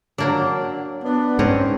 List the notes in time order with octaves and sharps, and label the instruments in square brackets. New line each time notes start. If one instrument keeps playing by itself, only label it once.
[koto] F#3 A#3 D4
[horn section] B3 D4
[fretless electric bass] G#2 [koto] C4 C#4